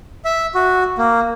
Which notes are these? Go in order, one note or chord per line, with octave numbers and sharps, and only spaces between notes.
E5
F#4
A#3